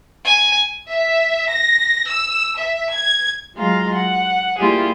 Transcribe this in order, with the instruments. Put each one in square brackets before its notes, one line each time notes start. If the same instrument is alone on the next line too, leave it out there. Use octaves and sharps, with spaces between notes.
[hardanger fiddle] G#5
[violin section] E5
A#6
E6
E5
G#6
[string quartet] F#3 G#3 F4 F5 A#5
F#5
G3 A#3 E4 F4 G4 G#4